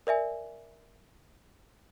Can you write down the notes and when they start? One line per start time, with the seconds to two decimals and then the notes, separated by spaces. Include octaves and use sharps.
0.07 A#4 D5 E5 G#5